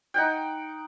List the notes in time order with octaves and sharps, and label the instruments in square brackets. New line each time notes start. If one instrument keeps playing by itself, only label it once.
[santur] D#4 F#5 G5